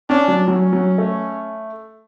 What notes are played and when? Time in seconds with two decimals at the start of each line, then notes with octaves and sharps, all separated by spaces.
0.09 C#4 D4
0.28 F#3
0.47 F#3 C#4
0.73 F#3
0.98 A3